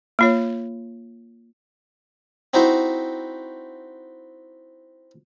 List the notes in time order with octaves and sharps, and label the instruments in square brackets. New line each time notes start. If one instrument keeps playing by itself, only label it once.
[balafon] A#3 F4 C#5
[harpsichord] C4 D#4 E4 F#4 C5